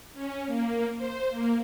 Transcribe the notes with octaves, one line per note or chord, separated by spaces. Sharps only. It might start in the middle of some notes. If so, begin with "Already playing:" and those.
C#4
A#3
C5
A#3